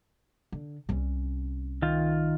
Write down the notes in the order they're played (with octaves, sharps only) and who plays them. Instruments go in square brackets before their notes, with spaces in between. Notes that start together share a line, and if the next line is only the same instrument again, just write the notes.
[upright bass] D3
C2 C#4
[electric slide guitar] D#3 F4